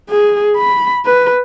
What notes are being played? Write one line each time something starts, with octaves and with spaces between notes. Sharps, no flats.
G#4
B5
B4